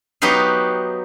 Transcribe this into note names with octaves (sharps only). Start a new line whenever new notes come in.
F#3 B3 D#4 G4 B4 F5